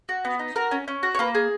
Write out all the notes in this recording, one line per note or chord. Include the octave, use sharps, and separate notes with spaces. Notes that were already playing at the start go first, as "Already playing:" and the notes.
F#4
B3
D#4
F#4 A#4
C#4
C#4
F#4
C#5
A#3 B4
G#4